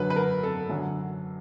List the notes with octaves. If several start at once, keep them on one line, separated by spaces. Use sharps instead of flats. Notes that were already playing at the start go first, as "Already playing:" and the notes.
Already playing: F#2 D3 F#3 B4
B4
A#4
A4
F#2 D3 F#3